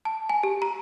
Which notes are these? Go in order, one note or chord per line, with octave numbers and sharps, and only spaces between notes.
A5
G#5
G4
A#5